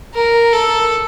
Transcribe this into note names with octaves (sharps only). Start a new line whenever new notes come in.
A#4
A4